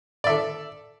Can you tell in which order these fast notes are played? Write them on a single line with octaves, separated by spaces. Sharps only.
D5 E5 A4